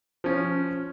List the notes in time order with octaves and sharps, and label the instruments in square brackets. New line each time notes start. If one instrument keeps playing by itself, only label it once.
[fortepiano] F3 C#4